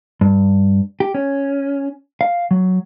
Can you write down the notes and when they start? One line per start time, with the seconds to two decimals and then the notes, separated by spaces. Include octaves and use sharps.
0.21 G2
1.00 G4
1.15 C#4
2.21 F5
2.51 F#3